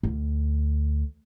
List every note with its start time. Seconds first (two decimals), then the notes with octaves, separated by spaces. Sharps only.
0.03 D2